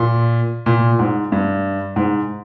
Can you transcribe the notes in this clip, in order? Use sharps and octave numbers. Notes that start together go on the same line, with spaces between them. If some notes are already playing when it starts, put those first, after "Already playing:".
Already playing: A#2
A#2
G#2
G2
G#2